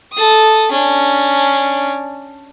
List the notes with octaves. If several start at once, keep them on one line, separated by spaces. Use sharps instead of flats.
A4 D#6
C#4 D4